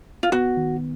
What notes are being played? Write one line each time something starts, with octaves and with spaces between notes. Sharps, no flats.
F4
B3 F#4
D#3